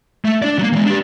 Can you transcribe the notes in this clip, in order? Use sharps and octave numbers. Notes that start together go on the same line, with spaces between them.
A3
D4 D5
F#3 A#3
E3 G#3
D4 G4